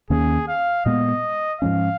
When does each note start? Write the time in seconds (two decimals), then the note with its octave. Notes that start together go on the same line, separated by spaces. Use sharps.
0.10 D#2 D#3 A#3 C#4 G#4
0.48 F5
0.86 A#2 G#3 B3 D#5
1.61 G#2 F3 G#3 C#4 F5